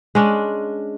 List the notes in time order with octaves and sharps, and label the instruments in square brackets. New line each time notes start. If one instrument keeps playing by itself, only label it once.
[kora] G#3 C#4 D4